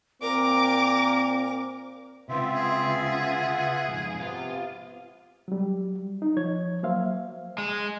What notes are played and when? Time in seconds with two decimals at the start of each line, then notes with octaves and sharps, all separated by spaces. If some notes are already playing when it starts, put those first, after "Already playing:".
0.22 A#2 C4 A#4 D6
2.29 C#2 C#3 B3 C4 F4 E5
2.55 G#4
3.11 F#5
3.88 F2 G#2
4.20 C3 B3 F4
5.48 F#3 G3
6.22 D#4
6.37 F3 C#5 G#6
6.83 F#3 A#3 C5 E5 F5
7.58 G#3